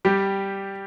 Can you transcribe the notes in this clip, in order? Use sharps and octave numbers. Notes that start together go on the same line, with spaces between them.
G3 G4